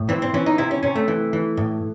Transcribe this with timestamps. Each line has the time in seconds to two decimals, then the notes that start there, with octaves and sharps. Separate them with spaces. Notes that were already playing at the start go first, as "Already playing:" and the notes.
Already playing: A2
0.09 E3 C4
0.22 C4
0.34 E3 C#4
0.46 D#4
0.58 C3 E4
0.71 C#4
0.83 C3 C#4
0.96 A3
1.08 E3
1.33 E3
1.57 A2